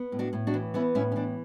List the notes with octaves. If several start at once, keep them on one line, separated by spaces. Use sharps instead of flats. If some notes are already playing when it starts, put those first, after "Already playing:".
Already playing: B3
A2
D4 F#4
A2
D4 F#4
E3
B3 C#4 E4
A2 C#4 E4
C#4
E3 D4